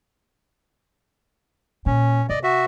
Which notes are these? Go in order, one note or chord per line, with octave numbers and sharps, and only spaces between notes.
A#2 C#4
C3 D5 D#5
F#4 E5